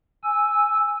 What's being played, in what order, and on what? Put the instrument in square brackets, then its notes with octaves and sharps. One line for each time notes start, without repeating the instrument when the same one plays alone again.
[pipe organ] G#5 E6